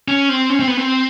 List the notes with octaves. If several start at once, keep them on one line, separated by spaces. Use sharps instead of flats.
C#4
C4
C#4
C4
B3
C4